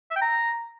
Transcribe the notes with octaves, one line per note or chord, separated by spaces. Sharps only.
E5
G5
A#5